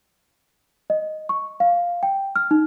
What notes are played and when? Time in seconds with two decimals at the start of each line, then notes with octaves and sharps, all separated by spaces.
0.90 D#5
1.29 C#6
1.60 F5
2.03 G5
2.36 F6
2.51 D#4